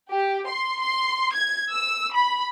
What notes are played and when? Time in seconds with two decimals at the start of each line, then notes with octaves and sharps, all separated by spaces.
0.11 G4
0.47 C6
0.80 C6
1.34 G#6
1.74 E6
2.13 B5